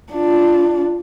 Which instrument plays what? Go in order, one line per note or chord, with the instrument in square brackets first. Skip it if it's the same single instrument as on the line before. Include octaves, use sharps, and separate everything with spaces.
[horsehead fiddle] D4 F4